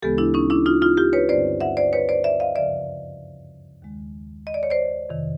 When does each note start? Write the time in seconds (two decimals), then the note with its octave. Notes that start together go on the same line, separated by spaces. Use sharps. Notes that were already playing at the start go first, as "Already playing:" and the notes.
0.02 D2 C#3 E3 G#3 B3 G4 A4
0.18 D4 E4
0.34 C#4 D#4
0.50 D4 E4
0.66 D#4 F4
0.82 D#4 F4
0.97 F4 G4
1.13 B4 C#5
1.29 G2 D3 G3 C4 C5 D5
1.60 E5 F#5
1.77 C5 D5
1.93 B4 C#5
2.09 C5 D5
2.24 D5 E5
2.40 D#5 F5
2.56 F#2 C#3 F3 D5 E5
3.82 D#2 D#3 G#3
4.47 D#5
4.54 D5
4.63 C#5
4.70 C5 D5
5.09 F2 C3 D#3